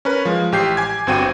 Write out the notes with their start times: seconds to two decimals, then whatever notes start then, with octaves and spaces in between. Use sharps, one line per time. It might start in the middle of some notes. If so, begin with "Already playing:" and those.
0.05 C#4 A#4 B4
0.25 F3 G#3
0.52 A1 G4 G6 C7
0.77 G#5 D6 G#6
1.07 G1 G2 C4 F#4 G5 D#7